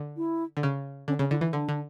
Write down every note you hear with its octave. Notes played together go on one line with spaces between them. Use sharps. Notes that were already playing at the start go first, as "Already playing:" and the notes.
Already playing: D3
E4
D3
C#3
D3 C#4
C#3 C#4
D3 E4
E3 E4
D3 D4
D3